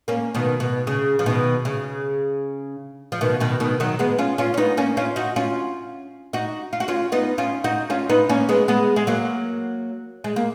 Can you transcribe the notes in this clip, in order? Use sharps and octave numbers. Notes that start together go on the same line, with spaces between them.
A#3 C#4
B2 D#3
B2
C#3
F3
B2 D#3
C#3
F3
B2 D#3
B2 D#3
B2 D#3
D#3 F#3
G#3 B3
C#4 F4
C#4 F4
C#4
B3 D#4
A#3 C#4
C#4 F4
D#4 F#4
C#4 F4
D#4 F#4
F4
F#4
C#4 F4
B3 D#4
C#4 F4
D#4 F#4
C#4 F4
B3 D#4
A#3 C#4
G#3 B3
G#3 B3
G#3
F#3 A#3
G#3
A#3